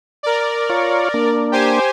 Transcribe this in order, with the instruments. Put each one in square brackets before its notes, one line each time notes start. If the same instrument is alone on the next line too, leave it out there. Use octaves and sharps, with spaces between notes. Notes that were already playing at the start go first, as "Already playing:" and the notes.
[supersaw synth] A#4 D5
[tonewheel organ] F4 C#5
A#3 D4
[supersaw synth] G4 C5 G#5